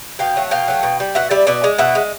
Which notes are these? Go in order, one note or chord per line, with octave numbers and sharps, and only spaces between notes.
B2 F5 G5
F#3 A3
B2 F5 G5
F#3 A3
B2
G3
B2 E5 F#5
G3 D5 E5
B2 D5 E5
G#3
B2 E5 F#5
G#3